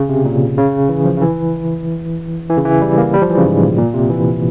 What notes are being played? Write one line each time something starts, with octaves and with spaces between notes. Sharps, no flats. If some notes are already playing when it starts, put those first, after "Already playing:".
Already playing: C#3
C3
A#2
C#3
E3
F3
C#3
E3
E3
C#3
E3
G3
A#3
G3
F3
E3
C#3
G#2
A#2
A#2
C3
E3